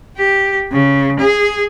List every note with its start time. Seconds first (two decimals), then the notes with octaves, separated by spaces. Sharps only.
0.17 G4
0.72 C#3
1.20 G#4